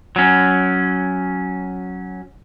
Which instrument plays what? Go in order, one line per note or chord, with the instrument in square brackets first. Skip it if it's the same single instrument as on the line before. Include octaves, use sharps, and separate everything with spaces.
[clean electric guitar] F#3 C#4